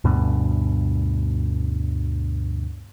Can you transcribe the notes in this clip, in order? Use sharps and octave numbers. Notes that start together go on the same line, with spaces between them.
D2 G2 B2 D3